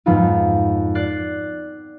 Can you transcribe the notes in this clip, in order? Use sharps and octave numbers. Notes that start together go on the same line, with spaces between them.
F2 G#2 F3 B3 D#4 F4
D5 F#6 A6 C7